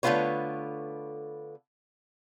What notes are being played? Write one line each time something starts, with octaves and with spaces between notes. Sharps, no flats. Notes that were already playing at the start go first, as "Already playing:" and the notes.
D3 A3 B3 F4 B4 C#5